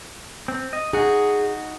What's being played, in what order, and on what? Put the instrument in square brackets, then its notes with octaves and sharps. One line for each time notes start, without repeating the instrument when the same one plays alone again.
[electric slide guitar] C4
D#5
[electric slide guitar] D#4 F#4 [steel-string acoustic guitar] G#4